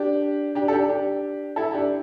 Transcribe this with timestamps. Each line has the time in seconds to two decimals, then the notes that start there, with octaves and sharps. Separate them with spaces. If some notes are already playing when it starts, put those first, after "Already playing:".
Already playing: D4 G4
0.55 D4 G4
0.68 A4
0.73 D4 G4
0.89 D4 G4
1.56 E4 A4
1.73 D4 G4